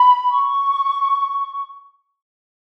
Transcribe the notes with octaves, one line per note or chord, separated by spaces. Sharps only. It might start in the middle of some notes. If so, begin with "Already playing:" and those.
Already playing: B5
C#6